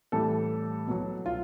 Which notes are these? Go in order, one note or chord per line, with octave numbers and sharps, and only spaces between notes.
A2 E3 G3 A4
B2 F#3
F4